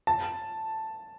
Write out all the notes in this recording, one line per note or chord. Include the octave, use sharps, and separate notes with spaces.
A5